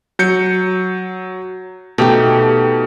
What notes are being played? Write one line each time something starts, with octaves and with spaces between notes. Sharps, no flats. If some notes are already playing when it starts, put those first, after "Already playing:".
F#3 G6 C#7
B2 A3 D#4 G4 G5